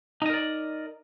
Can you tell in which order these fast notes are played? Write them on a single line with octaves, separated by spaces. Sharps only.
D#4 D#5 A#4 D5